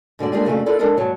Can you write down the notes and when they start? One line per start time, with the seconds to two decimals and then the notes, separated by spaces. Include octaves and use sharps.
0.19 G#2 D3 F#4 D5
0.32 G3 G#3 A#3 D4 F4 G#4
0.45 F2 C#3 A3 F#4 F5
0.66 E4 F4 A4 A#4 D5 F5
0.79 G#3 D4 E4 A4 A#4 D#5
0.97 D#2 G#2 F#3 A5